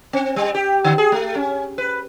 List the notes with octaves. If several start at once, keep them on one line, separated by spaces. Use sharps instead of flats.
C4
G3
G4
D3
G#4
A3
C#4
B4